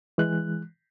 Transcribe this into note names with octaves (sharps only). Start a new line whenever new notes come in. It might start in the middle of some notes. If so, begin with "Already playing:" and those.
E3 G#3 F#6